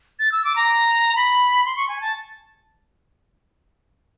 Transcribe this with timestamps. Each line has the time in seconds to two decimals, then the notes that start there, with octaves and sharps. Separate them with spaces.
0.19 A6
0.32 E6
0.45 D6
0.56 A#5
1.16 B5
1.65 C6
1.77 C#6
1.89 G#5
2.01 A5